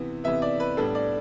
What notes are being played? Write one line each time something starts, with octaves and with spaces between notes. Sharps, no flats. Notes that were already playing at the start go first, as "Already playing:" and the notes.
Already playing: C3 E3 B3
C3 E3 B3 E5
D5
B4
A2 G3 B3 D4 A4
D5